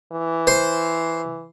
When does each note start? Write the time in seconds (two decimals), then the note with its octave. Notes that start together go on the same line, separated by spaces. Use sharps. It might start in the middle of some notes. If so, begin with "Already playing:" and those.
0.12 E3
0.47 C5